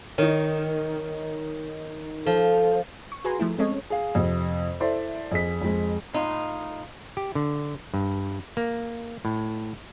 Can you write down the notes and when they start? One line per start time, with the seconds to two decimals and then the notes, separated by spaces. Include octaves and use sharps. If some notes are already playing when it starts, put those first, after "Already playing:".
0.18 D#3 D#4 C#5
2.26 F3 A4
3.12 C#6
3.25 F#4 G#4 B4 G#5 A#5 C6
3.40 F3 A3 E4
3.58 G#3 C4 C#4 A4 C#5 D#5
3.90 G#4 F5
4.15 F2 C3
4.80 E4 A4 C5 D5 E5
5.32 F2 G#4 B6
5.62 F2 G#3
6.13 A2 D#4 F4
7.17 G4
7.35 D3
7.94 G2
8.57 A#3
9.25 A2